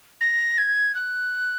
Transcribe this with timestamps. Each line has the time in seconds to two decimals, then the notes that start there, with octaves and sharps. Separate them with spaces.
0.21 A#6
0.58 G#6
0.95 F#6